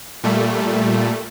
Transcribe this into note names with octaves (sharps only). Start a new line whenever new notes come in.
A#2 G3 A3